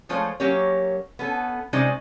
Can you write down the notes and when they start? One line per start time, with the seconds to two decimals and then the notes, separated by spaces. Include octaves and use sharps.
0.09 F3 G#3 A3 F4 C5 C#5
0.40 F#3 A#3 C#4 G4 A#4 C#5
1.19 B3 C#4 A4
1.73 C3 G#3 C#4 D#4 C5 D5